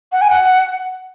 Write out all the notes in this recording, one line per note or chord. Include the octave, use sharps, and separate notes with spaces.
F#5
G#5
F#5